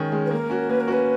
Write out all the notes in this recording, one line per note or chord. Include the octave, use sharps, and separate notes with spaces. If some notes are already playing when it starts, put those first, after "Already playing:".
Already playing: D#3 G#3 C#4
G#3 C#4
B4
A#3 A#4
C#4 F#4
A#3 B4
A#4
C#4 F#4 B4